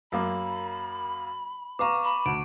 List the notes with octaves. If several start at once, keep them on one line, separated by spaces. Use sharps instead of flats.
F#2 A#3 B5 D6
B3 F5 A#5 C#6 D6
B5
D2 D7